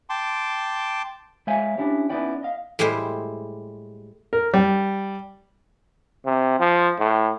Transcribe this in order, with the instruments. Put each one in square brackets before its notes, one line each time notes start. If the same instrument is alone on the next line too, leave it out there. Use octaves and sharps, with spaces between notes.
[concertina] G5 A5 C6 D6
[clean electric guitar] G#3 C5 C#5 E5 F5 G#5
C#4 D4 E4 G4 C#5
B3 C#4 D#4 E4 D5 G5
D#5 F5
[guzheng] A2 G3 G#3 E4 C5
[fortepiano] A#4
G3
[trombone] C3
F3
A2